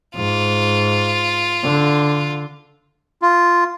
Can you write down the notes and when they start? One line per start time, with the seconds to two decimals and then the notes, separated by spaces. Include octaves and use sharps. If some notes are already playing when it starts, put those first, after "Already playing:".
0.15 G#2 F4
1.64 D3
3.22 F4